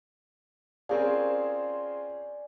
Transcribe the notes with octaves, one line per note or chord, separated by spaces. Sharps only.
C4 C#4 F4 G#4 A#4 C5 D5 G#5